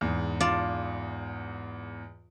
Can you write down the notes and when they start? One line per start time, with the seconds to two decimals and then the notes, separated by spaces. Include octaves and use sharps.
0.01 E2 G#2
0.40 F4 D5 A5